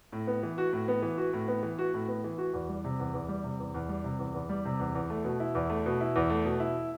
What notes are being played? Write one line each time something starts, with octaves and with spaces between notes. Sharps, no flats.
A2
B3
E3
F#4
A2
B3
E3
F#4
A2
B3
E3
F#4
A2
B3
E3
F#4
E2
G3
C3
E2
E2
G3
C3
E2
E2
G3
C3
E2
E2
G3
C3
E2
E2
A3
B2
E4
E2
A3
B2
E4
E2
A3
B2
E4